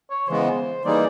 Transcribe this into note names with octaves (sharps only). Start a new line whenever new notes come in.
C#5
C#3 E3 G#3 B3 C5
E3 G3 A#3 D#4 G#4 D5